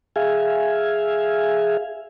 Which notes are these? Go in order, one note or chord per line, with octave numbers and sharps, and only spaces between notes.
G#4 E5 F5 G#5